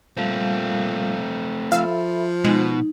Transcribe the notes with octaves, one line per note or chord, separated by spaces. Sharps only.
A#2 G3 A3 C4 F5 A5
F3 A4 E5 F5 B5 E6
B2 G#3 D#4